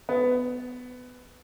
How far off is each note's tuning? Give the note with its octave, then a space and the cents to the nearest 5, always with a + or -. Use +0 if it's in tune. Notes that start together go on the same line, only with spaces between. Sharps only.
B3 +15